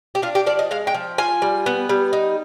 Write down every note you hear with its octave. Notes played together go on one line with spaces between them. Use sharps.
G4
D4 F4
G4
F3 D5
D#5
G#3 F5
G5
F3
F4 G#5
G3
B3
G3
D#4